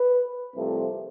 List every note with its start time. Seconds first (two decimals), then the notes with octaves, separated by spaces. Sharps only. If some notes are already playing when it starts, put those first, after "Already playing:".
Already playing: B4
0.54 C2 C3 F3 A3